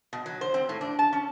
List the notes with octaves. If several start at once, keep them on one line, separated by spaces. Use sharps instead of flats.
B2
F#3
C5
C4
A2
D4
A5
C#4